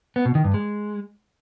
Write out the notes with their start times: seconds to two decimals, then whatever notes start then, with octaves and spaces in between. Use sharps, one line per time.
0.16 B3
0.26 B2
0.35 D#3
0.45 G2
0.54 G#3